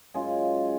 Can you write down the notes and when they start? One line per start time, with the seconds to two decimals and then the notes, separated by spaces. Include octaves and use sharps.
0.14 F#2 C#3 G#3 F4 G#4